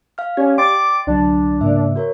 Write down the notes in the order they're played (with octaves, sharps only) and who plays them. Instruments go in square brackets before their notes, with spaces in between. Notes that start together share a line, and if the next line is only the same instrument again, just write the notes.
[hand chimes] F5 F6
[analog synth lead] C#4 [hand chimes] G4 D5 [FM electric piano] G#6
[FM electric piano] D5 G5 [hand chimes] C6 A6 [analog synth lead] D6
[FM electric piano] C2 D3 F#3 [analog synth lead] D4
[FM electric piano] G#2 C#3 A#3 [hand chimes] E5
[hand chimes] F#4 A#4 C#5